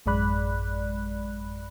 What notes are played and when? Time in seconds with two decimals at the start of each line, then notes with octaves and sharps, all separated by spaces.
0.06 A1 F#2 G#3 D5 B5 F#6